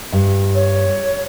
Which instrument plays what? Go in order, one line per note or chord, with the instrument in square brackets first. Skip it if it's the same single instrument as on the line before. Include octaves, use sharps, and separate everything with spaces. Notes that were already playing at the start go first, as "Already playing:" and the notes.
[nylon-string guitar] G2
[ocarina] C#5